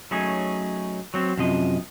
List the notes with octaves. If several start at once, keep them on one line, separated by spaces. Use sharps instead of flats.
F#3 A3 C#4 D#4 G#4
F#3 C4
F#2 C3 F3 D#5